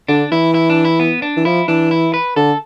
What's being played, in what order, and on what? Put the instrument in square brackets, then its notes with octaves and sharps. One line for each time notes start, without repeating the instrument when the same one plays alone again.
[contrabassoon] D3 [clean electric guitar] D4
[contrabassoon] E3 [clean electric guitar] E4
[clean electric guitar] E4
D4
E4
B3
D4
[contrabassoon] E3
[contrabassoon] F3 [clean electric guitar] E4
[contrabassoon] E3 [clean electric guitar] D4
[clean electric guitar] E4
B4
[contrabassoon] D3 [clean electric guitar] A4